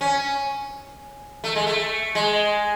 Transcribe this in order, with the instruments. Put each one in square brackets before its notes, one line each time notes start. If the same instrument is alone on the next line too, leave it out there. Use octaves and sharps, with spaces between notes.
[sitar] C#4
A3
G#3
A3
G#3